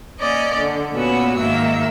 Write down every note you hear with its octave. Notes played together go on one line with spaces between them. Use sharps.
A#3 C#4 D5 D#5
D3
A#2 B3 C#4 F#4 B4 E6
G#2 D#3 A#3 E5 E6